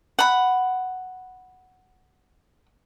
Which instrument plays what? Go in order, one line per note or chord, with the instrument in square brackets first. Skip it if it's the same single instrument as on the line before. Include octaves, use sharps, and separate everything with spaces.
[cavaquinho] F#5 B5